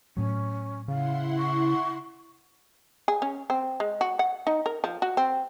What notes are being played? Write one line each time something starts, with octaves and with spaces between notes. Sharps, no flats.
A2 F#3 C#4
C#3 E4 F5 F#5 C6
C#6
G#4
C#4
C4
G#3
F#4
F#5
D#4
A#4
F3
F#4
C4